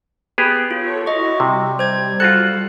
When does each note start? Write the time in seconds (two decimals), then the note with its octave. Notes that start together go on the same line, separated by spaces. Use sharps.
0.38 B3 G4 G#4
0.71 F4 A4 C#5
1.06 E4 F#4 D#5 C#6
1.40 C3 G3
1.79 C5 G#6
2.20 F4 F#4 A4 F#6